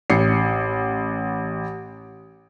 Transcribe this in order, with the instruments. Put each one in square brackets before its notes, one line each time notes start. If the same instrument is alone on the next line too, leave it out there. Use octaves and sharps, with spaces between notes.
[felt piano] A1 C7 C#7